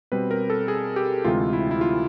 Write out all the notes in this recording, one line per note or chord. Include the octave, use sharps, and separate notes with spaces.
B2 G3 C4 B4
A#4
A4
G#4
G4
D2 C3 E3 G#3 C4 F4
E4
E4
F4